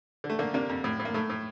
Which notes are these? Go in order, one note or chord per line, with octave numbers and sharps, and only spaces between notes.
D3
A3
D3 A#3
C3 A#3 D4
F2
A2
A2
A#3
A2 A3
A2